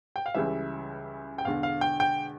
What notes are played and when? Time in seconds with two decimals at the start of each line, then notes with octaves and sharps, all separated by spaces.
0.16 G5
0.26 F5
0.35 C#2 C#3 E3 G3 E5
1.38 G5
1.45 E1 E2 D3 F5
1.63 F5
1.81 G5
2.00 G5